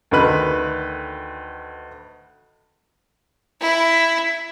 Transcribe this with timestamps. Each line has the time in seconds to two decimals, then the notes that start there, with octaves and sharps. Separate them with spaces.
0.11 D2 D3 D#3 B4 F#6
3.61 E4